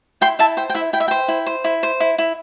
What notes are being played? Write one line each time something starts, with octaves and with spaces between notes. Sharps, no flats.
E4 G5 C6
E4 E5 A5
C5 G5
G5
E4 E5
E4 G5
E5
C5 G5
E4
C5
E4
C5
E4
E4